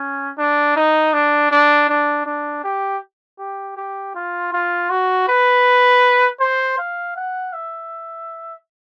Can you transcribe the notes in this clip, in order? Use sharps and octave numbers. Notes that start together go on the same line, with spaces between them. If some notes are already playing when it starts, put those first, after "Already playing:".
Already playing: C#4
D4
D#4
D4
D4
D4
D4
G4
G4
G4
F4
F4
F#4
B4
C5
F5
F#5
E5